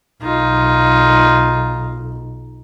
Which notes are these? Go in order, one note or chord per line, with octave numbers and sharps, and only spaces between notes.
B1 D#4 F4